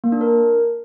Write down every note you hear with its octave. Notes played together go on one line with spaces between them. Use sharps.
A#3
D4
A#4